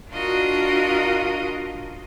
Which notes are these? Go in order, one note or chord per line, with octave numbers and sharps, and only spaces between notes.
D4 F4 F#4 A#4 D#5